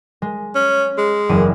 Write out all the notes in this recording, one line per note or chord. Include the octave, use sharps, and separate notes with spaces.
G#3
C#4
G#3
F#1 E2 D#7